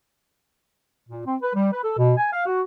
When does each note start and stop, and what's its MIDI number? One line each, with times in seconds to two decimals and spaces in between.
1.09 1.25 46
1.25 1.36 60
1.42 1.52 71
1.55 1.69 55
1.72 1.83 71
1.84 1.95 69
1.97 2.14 47
2.18 2.33 80
2.33 2.42 77
2.46 2.61 66